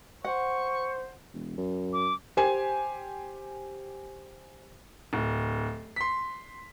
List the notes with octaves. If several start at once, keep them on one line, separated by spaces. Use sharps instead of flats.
C5 F#5 C#6
E1
F#2
D6
G4 C5 G#5
D1
C6 B6